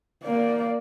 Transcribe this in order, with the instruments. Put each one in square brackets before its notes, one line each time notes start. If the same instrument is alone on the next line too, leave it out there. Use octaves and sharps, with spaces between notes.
[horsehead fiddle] A#3 D5